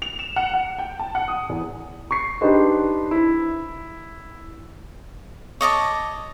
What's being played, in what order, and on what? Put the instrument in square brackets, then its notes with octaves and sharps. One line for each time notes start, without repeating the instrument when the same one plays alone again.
[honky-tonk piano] F7
E7
F#5
F#5
G5
A5
F#5
D#6
E2
[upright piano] C#6 C7
D4 D#4 G4 B4 C5 D#5
E4
[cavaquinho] C#5 D#5 A5 D6